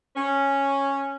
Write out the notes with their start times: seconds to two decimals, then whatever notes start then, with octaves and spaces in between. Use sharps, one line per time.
0.16 C#4